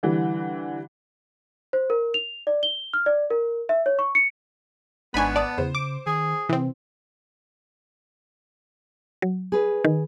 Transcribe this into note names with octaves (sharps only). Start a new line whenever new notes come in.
D3 E3 G3
C5
A#4
F7
D5
G7
F6
D5
A#4
E5
C#5
C#6
C#7
G#1 G#2 B3 D4 G#5 B5 C#6
D5 A5 D#6
E2 C#3 C5
D6
D#3 G#4
C3 E3 C4
F#3
G#4 B4
D#3